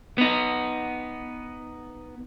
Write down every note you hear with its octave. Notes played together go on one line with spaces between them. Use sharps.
B3 D#4